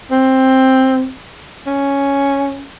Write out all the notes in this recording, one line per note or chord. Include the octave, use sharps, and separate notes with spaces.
C4
C#4